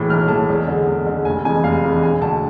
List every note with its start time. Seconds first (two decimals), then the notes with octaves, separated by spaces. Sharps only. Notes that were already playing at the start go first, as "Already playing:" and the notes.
Already playing: A2 E3 G#3
0.09 B1 F6
0.28 A2 E3 G#3 A5
0.49 E2
0.67 D3 G#3
0.86 E2
1.07 D3 G#3
1.25 F1 G#5
1.44 F2 E3 G#3 G#5
1.63 F1 F5
1.83 F2 E3 G#3
2.03 E1 G#5
2.21 D2 D3 A5